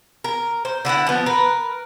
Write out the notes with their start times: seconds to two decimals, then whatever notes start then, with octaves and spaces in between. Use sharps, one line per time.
0.24 A#4
0.65 C5
0.85 D3 E4 F4 F#5
1.07 F3 B3
1.26 A#4 B4